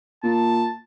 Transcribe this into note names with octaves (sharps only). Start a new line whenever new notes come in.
A#2 A5